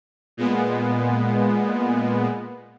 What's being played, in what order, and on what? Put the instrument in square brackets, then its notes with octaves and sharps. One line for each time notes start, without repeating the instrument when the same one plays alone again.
[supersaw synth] A#2 G#3 B3